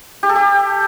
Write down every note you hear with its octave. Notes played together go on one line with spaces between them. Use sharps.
G4
A4
G4